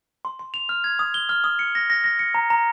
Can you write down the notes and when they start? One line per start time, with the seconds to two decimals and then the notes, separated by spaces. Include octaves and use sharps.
0.25 C6
0.39 C6
0.54 F7
0.69 F6
0.84 G#6
0.99 D#6
1.14 G7
1.29 F6
1.44 D#6
1.59 C#7
1.75 A#6
1.90 A#6
2.04 A#6
2.19 C#7
2.35 A#5
2.50 A#5